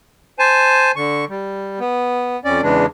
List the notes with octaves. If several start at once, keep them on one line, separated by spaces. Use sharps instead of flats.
C5 G#5 A5
D3 C#6
G3
B3
F2 C#4 D5
E2 C#3 E3 G#3 D4